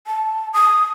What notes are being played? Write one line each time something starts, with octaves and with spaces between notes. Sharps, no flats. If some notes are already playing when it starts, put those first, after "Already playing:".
A5
D#6